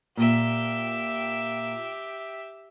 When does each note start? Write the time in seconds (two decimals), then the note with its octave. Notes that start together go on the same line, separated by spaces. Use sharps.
0.17 A#2 G4 E5